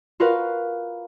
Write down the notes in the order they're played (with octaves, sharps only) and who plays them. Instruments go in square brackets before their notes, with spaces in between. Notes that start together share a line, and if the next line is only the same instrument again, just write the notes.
[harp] F4 F#4 A#4 B4 F5